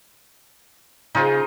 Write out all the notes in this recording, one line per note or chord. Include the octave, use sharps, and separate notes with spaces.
C#3 D#4 F4 C5